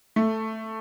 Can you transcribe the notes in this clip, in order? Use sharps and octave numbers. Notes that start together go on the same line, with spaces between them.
A3